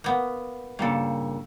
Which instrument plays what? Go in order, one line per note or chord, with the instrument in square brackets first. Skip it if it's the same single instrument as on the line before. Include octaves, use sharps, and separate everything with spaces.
[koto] A#3 B3
[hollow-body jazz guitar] G2 A#2 C#3 [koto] A#3 A4